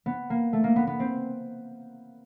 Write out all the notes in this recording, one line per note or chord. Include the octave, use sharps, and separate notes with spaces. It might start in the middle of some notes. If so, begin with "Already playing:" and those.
B3
A#3
A3
A#3
B3
B3
C4